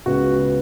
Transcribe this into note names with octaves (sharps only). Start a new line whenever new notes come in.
C#2 C#3 G#3 B3 F#4